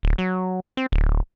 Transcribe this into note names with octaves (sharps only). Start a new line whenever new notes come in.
D1
F#3
C4
D1